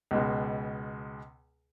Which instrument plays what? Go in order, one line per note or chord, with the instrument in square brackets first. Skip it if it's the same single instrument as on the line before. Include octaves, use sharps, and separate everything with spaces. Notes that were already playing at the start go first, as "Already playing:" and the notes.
[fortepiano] C#2 B2 G#3